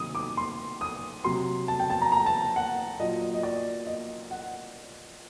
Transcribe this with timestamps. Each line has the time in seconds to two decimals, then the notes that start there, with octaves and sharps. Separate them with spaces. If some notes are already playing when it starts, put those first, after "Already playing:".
Already playing: C3 D#3 F#3 D#6
0.15 D6
0.37 C6
0.81 D#6
1.24 C3 F#3 C6
1.68 A5
1.80 G5
1.90 A5
2.02 A#5
2.12 A#5
2.26 A5
2.56 F#5
2.99 A#2 F#3 D#5
3.21 D#5
3.34 D#5
3.43 D5
3.87 D#5
4.31 F#5